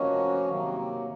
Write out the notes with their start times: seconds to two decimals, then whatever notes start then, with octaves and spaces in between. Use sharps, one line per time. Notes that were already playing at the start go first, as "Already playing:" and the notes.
Already playing: F3 A#3 C#4 F#4 C#5 D#5
0.49 C3 D#3 F#3 A#3